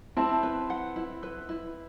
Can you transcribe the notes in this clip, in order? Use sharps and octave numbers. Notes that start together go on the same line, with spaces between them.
C4 E4 A5
B4
F#5
E4
B4
E4